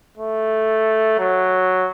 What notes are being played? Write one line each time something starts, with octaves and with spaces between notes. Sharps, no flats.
A3
F#3